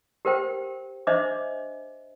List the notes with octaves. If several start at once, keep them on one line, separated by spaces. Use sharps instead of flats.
G4 A#4 C5 G5
D4 C5 D#5 E5 D6